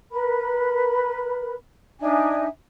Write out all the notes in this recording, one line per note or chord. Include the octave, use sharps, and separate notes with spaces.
A#4 B4 B5
D4 D#4 E5 G#5